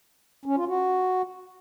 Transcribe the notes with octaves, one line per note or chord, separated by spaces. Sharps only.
C#4
F4
F#4